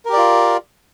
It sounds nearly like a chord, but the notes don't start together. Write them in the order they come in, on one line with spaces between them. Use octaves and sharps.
A#4 G4 D5 F4